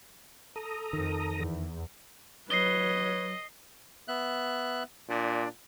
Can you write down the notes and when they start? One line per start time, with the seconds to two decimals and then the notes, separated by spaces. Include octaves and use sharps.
0.56 A4 A#5 D#6
0.93 F2 D#3
1.36 E2
2.50 F#3 B4 C#5 D#5 C7 G7
4.08 B3 E5 F#6
5.09 A#2 D4 D5